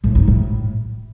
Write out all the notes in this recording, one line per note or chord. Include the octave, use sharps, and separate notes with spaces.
A2
G#2
A2